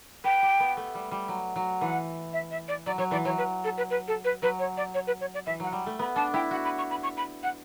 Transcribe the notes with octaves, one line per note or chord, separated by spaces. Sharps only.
B4 G5
G4
B3
A3
G3
G3
F#3
F#3
E3 F#5
E5
E5
D5
F#3 D5
F#3 C#5
E3 D5
F#3 C#5
B4
A4
B4
B4
A4
B4
F#3 B4
C#5
D5
C#5
B4
C#5
D5
E3 E5
F#3 F#5
G3
A3
B3 B5
D4 A5
E4 G5
F#4 F#5
B5
C#6
B5
C#6
B5
F#5